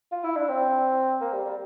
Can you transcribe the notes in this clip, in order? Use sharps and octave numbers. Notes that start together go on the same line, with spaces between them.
F4
E4
D4
C4
A#3
G3
G3